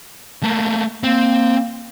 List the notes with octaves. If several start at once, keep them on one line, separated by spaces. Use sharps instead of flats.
A3 A#3
A#3 C4